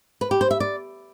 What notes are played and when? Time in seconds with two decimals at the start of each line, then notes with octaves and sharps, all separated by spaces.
0.21 B4
0.31 G4
0.41 C5
0.51 E5
0.60 D5